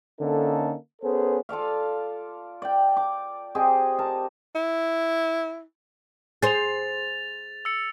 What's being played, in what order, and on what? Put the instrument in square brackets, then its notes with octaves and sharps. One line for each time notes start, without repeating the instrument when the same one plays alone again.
[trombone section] D3 A#3 C#4 D#4 A4
B3 C#4 G#4 A4 C5
[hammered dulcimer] F4 A4 D5 F5
D5 G5
D6
C4 G4 G#4 D#5
A#4 A5
[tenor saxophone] E4
[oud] G#4 C5 [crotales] A6 F7
[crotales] E6 C#7